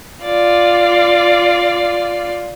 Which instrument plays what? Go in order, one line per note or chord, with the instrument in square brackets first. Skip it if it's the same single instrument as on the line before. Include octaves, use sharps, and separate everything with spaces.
[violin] F4 D5